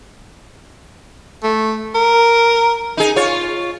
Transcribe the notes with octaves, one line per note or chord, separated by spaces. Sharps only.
A3
A#4
D#4 G#4
F4 C#5